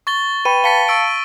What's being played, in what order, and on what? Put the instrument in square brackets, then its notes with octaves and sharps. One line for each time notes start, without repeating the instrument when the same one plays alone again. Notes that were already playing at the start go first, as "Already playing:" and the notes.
[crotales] C#6 A6 G7
[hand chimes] B4 G5 B5 [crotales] D#7
[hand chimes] F5 A5 C#7 [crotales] A6 B6 G7
[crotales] C#6 E6 D7